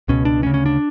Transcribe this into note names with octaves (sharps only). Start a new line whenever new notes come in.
C#2 B2 C#4
D4
D2 C#3 C#4
C#4
D4